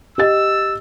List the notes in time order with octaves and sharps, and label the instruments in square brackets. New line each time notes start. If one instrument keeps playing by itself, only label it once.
[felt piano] G4 D#5 A6 [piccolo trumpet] E6